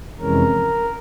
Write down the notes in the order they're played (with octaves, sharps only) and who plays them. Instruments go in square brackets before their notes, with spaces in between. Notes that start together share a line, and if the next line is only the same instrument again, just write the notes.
[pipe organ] F2 C3 E3 G#3 C#4 A#4